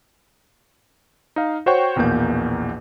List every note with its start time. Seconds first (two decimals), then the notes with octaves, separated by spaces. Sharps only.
1.36 D#4 F5
1.66 F#4 C5 C#5 F#5 G5 C#6
1.96 A#1 E2 B2 A#3 G6